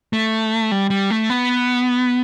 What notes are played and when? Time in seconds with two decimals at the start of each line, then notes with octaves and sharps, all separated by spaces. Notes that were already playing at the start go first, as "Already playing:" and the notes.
0.13 A3
0.72 G3
0.90 G3
1.10 A3
1.30 B3